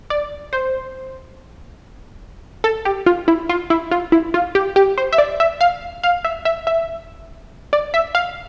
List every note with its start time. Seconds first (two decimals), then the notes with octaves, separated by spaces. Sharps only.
0.10 D5
0.53 C5
2.64 A4
2.85 G4
3.06 F4
3.28 E4
3.49 F4
3.70 E4
3.91 F4
4.12 E4
4.34 F4
4.55 G4
4.76 G4
4.98 C5
5.13 E5
5.18 D5
5.40 E5
5.61 F5
6.03 F5
6.25 E5
6.45 E5
6.67 E5
7.73 D5
7.94 E5
8.15 F5